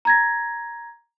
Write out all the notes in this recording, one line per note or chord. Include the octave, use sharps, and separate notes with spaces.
A#5 G#6 A#6